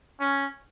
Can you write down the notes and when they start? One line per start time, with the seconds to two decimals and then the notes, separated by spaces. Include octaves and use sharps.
0.20 C#4